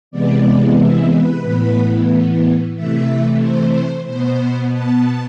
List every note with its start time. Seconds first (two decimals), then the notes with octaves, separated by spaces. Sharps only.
0.11 C3 E3 G#3 B3 D5
0.78 E5
1.11 B4
1.43 A2 E3 B3
2.75 C3 E3 A3 E5
3.41 C5
4.07 B2 B3 C5
4.73 A5